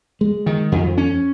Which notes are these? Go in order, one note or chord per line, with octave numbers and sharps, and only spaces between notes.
G#3
D#3
F2
C#4